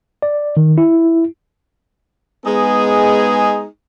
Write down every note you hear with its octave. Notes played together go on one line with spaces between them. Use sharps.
D5
D#3
E4
G#3 B3 D#4 G#4